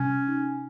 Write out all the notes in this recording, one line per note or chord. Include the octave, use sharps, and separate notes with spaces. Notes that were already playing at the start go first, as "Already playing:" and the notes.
Already playing: C3 G3 C#4
D#4